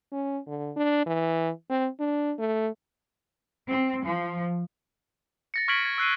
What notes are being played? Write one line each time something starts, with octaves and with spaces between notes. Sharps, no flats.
C#4
D3
D4
E3
C4
D4
A3
C4
F3
A6 A#6 C#7
C#6 F6 G#6 B6 D7 F#7
G#6
E6 F#6 C7 D#7